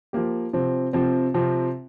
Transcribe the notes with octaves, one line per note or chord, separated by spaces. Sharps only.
F3 A#3 G4
C3 F3 C4
C3 F3 C4
C3 F3 C4